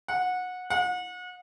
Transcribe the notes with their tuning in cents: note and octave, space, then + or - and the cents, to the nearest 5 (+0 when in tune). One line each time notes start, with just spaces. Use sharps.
F#5 -20
F#5 -35